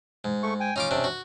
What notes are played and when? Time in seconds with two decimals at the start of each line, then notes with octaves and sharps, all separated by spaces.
0.24 G#2
0.43 A3 C#6
0.60 G5 G#5
0.76 C#4 D#4 F4 D6
0.91 C3 D4
1.04 F#4